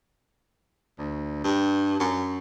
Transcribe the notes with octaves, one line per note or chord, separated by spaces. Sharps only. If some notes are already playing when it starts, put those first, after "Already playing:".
D2
G2
F#2